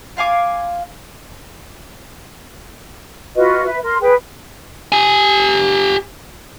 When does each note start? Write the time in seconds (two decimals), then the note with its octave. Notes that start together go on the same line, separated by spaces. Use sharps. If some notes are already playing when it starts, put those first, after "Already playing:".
0.17 F4 F5 G#5 D6
3.35 F4 F#4 B4 D#5
3.65 B4 E5
3.83 A#4 C6
4.00 G#4 B4 G5
4.92 G4 G#5